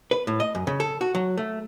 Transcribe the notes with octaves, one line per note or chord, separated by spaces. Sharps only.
B4
A2
D#5
F#2
C#3
A4
F#4
F#3
A3